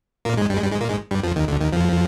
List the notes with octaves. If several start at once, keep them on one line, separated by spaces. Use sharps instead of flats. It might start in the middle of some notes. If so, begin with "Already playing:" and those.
A#2 A#3
G#2 G#3
G2 G3
G#3
G2 G3
G#2 G#3
A#2 A#3
G#2 G#3
G2 G3
F2 F3
D#2 D#3
D2 D3
D#2 D#3
F2 F3